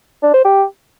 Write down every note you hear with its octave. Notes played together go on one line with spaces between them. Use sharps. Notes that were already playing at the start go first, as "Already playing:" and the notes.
D4
C5
G4